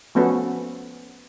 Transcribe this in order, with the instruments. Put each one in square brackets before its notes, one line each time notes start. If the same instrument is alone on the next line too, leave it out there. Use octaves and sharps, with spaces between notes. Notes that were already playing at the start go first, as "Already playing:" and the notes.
[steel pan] F3 A3 B3 C#4 F#4 A4